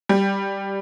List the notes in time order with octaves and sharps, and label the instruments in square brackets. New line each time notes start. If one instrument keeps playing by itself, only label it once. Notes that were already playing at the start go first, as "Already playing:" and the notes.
[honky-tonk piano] G3